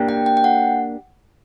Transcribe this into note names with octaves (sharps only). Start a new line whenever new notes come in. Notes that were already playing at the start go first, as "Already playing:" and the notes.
Already playing: A#3 D4 G4
G5
G5
G5
F#5